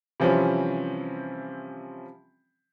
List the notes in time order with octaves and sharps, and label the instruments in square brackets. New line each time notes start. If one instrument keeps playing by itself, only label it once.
[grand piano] C3 E3 F3 G3 C4 C#4